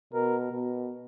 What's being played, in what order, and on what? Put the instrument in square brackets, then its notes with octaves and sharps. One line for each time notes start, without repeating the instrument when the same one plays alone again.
[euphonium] B2 [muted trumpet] A#4
[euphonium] B2